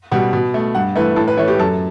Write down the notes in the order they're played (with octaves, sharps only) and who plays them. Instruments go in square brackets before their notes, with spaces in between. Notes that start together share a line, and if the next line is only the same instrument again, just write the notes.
[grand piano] B2 G3 F#5
B2
A3
G2 F#5
E3 A3 B4
A2 A4
B4
E3 A3 C#5
G4
F#2 A4